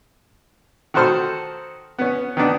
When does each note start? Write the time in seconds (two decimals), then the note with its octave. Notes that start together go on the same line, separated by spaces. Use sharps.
0.94 D#3 F#4 A4 C5 F6
1.99 B3 C#4
2.37 D#3 B3 D4